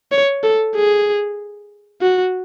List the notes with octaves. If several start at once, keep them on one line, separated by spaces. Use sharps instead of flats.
C#5
A4
G#4
F#4